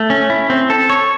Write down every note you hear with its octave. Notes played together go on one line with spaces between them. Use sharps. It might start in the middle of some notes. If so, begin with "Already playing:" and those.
Already playing: A3
C#4
E4
C4
A4
C#5